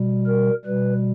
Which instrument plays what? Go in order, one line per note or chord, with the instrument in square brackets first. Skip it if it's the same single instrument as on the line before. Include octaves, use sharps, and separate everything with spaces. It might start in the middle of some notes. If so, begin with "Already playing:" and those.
Already playing: [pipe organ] B2 G3
A#4
B2 G3 B4